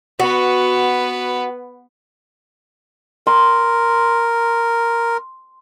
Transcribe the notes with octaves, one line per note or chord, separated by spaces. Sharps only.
B3 F#4 B4
A#4 C6